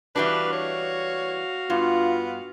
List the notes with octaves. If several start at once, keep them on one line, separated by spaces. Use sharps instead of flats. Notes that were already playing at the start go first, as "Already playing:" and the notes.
E3 G3 D4 F#4 B4 F5
C#5
G2 B3 F4